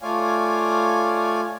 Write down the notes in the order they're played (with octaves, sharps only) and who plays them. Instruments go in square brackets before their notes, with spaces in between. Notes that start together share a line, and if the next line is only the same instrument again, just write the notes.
[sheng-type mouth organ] A3 F4 C#5 D5 F5 G#5